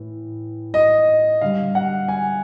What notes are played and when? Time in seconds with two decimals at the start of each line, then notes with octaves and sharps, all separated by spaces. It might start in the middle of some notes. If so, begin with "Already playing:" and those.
Already playing: A2 E3
0.74 D#5
1.41 D3 G3 F5
1.75 F#5
2.08 G#5